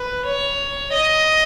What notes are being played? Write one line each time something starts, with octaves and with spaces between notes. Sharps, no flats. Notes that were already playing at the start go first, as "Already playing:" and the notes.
Already playing: B4
C#5
D#5